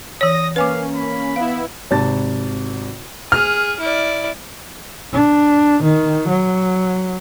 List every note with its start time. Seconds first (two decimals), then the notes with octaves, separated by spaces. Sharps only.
0.21 E3 C#5 D#6 A#6
0.56 A#3 C#4 B4 F5 G#5 D6
0.95 B5
1.36 B3 E4 F5
1.91 G#1 C3 A5 A6
3.32 G#4 F6
3.81 E4 D5
5.13 D4
5.83 D#3
6.28 F#3